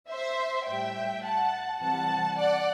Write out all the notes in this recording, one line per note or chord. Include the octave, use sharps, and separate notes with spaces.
C5 E5
A2 G3 E5 G5
F#5 A5
C3 E3 G3 F#5 A5
D5 F#5